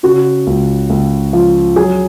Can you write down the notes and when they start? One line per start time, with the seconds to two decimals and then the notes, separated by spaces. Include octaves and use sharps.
0.03 C#3 F#4
0.47 C#2
0.90 C#2
1.33 F3
1.76 F#3 G#4